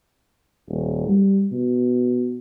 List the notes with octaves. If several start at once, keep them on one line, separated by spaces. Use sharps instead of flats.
D#1
G3
B2